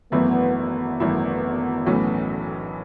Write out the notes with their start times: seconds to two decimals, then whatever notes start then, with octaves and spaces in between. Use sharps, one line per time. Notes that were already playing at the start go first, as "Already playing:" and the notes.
0.12 G#1 F#2 E3 A3 B3 E4
0.56 B3
1.00 G#1 F#2 E3 A3 E4
1.86 B1 A2 E3 A3 C#4